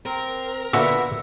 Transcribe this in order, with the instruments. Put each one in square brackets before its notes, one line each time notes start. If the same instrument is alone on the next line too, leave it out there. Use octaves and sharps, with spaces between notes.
[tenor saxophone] C4 [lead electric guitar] A#4
[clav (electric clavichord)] A#2 D3 F#4 [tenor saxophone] B3 [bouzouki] E5